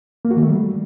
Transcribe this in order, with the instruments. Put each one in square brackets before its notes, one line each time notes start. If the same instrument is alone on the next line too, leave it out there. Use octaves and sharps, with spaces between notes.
[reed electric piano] A#3
F#4
D#3
A3
G3